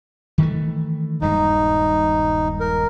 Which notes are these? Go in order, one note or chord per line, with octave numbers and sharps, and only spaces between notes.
D#3 E3 A3
D#1 G2 G#3 D#4
A#4